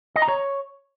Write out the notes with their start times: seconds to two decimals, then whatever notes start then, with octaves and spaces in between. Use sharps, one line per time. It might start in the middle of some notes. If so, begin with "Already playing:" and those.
0.16 D#5
0.22 A#5
0.28 C#5